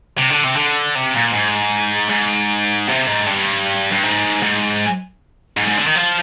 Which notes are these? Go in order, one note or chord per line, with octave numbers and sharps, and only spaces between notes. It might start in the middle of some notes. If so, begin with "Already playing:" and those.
C3
D3
C3
D3
C3
A#2
G#2
G#2
C3
G#2
G2
G2
G#2
G#2
G#2
G#2
D3
D#3
F3